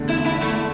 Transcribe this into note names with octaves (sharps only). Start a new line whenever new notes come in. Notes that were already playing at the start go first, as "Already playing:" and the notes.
Already playing: E2 D3 A3
E4
E4
A3